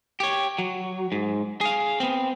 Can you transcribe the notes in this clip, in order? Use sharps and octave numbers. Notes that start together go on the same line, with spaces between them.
G4 C#5
F#3
G#2
G#4 F5
B3 C4